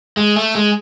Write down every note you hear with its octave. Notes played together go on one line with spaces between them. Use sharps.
G#3
A3
G#3